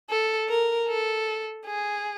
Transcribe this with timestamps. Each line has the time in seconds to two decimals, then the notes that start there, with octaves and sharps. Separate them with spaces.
0.10 A4
0.49 A#4
0.88 A4
1.66 G#4